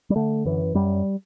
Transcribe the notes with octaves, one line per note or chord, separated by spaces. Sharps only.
G3
D3 A3
F#2 E3
F#2 G3